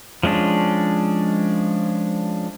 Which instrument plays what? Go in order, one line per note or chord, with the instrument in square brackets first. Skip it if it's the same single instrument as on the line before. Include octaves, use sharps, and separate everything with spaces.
[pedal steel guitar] F3 G#3 C#4 D4